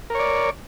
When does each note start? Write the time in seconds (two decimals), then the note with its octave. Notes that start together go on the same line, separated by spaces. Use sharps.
0.10 A#4
0.15 C#5
0.19 D5